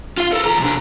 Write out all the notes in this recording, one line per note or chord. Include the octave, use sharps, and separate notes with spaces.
F4 F5
A4 A#4
D#2 A#5
C3 D4